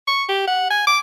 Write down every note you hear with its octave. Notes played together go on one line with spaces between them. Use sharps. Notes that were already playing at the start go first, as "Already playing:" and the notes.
C#6
G4
F#5
G#5
D6